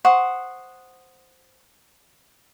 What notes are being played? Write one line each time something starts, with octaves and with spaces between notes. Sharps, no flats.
C5 F#5 C#6 D#6